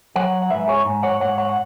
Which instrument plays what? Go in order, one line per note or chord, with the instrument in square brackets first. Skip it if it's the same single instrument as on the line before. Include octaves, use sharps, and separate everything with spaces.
[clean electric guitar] F#3 C#5 F#5
F#5
G#2 B4 E5
G#4 C#5
G#2
C#5 F#5
G#2 C#5 F#5
C#5 F#5
F#5